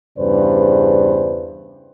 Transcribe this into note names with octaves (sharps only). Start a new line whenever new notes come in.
E2 G2 C#3 B4 C5 D5